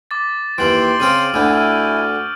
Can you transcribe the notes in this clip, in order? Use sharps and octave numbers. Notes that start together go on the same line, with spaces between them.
D6 A6
D#2 E3 G5 C6 D7 F#7
C#3 C4 C5 D#6 F6 D#7
D2 D3 E4 G#5 E6 G6
C#6 E6 F6